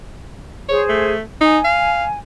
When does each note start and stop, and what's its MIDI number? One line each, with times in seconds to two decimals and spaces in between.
0.69 1.13 68
0.69 1.13 72
0.69 0.82 73
0.89 1.21 57
1.41 1.59 63
1.41 2.18 80
1.64 2.04 77